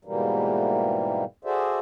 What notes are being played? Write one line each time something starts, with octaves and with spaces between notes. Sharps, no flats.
G#2 B2 E3 G3 A#3
F#4 G#4 A4 C5 D5 E5